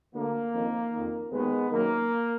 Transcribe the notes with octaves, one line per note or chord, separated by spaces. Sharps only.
D2 D3 A#3
F2 D#3
F2 D#3
D#2 D#3 G#3 B3
F#2 D#3 A#3